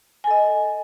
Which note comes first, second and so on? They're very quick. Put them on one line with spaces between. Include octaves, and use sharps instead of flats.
G#5 A4 D#5